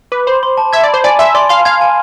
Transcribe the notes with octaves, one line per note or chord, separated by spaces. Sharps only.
B4 D6
C5 B5
C6
A5
E5 G#6
D5
C5 B5
D5 G#5
E5 C6
D5 C6
F5 C6
F5 G#6
G#5